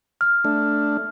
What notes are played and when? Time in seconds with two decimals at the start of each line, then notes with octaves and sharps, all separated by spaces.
0.21 F6
0.44 A3 D4